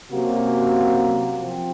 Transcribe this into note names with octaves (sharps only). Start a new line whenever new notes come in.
C3 F#3 A#3 C#4 F#4
C3 F3 C4